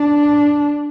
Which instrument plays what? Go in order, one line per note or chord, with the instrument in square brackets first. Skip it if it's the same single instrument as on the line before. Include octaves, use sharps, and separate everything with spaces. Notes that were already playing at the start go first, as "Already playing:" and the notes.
Already playing: [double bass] D4